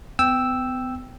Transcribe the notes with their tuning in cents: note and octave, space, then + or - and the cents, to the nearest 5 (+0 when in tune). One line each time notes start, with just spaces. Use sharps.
B3 +40 G5 +0 E6 +0